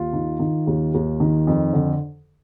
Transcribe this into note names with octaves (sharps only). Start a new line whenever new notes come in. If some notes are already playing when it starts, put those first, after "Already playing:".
Already playing: D#2 F4
D#3
D#3
D#2
D#2
D#3
F2
D3